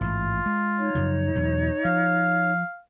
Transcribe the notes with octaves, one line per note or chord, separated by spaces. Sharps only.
A1 G#2 F4
G#3
D#4 C#5
F#2 C#3 F3
E2 B2 F#3
F3 F5